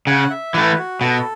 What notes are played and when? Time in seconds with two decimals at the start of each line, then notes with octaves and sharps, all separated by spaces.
0.07 C#3 F#5
0.30 E5
0.54 E3 A3 B4
0.78 F#4
1.01 B2 A4